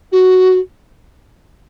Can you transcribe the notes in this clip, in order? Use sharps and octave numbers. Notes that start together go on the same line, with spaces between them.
F#4